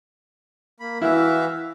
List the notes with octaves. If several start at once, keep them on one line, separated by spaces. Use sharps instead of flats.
A#3 B5
E3 E4 F#4 E5 F5